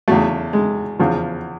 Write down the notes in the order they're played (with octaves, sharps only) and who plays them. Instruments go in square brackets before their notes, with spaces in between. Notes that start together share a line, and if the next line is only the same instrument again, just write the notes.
[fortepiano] E2 C#3 F#3 A3
G#3
E2 C#3 F3